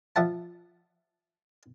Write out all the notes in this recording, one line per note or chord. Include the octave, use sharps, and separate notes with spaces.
F3 E5 F#5 A5